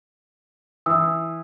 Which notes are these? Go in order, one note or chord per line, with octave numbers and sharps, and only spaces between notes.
E3 D#6 E6